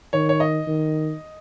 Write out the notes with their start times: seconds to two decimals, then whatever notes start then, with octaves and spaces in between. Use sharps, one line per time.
0.13 D#3 C#5
0.29 C#5
0.40 D#5
0.67 D#3